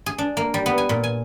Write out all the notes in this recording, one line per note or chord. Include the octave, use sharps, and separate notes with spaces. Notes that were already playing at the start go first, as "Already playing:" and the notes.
G#4
D4
A#3
G3
B3
G#5
A#2
G#5